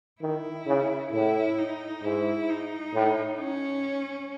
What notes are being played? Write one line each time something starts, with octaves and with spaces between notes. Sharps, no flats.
D#3 E4
C#3
A2 E4
D#4
G#2 E4
D#4
A2
C#4